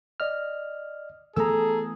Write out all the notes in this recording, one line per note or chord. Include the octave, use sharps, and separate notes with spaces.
D5 D#5 F6
E3 A3 B3 G#4 A4 A#5 E6